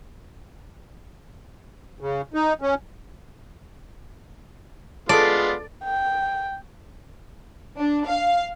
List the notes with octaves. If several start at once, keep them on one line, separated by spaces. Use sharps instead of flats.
C#3
D#4
C#4
G#3 B3 F4 A4 C5 D5 A5
G5
D4
F5